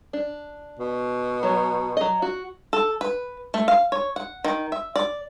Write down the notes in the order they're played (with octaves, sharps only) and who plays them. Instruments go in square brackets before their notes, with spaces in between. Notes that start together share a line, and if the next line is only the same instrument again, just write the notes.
[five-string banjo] D4
[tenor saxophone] B2
[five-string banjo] F#3 C#5
F#3 D#5
F#4
A4
B4
A3
F5
C#5
F#5
D#3
E5
D5